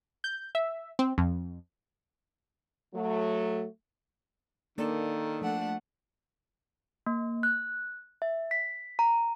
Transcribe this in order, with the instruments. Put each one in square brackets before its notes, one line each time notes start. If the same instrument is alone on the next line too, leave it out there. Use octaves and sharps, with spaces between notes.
[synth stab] G6
E5
C4
F2
[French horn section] F#3 A3
[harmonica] D#3 [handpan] A#3 D4 D5 [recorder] A4
[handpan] F3 [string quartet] A3 D4 F#5
[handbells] A#3
F#6
E5
B6
A#5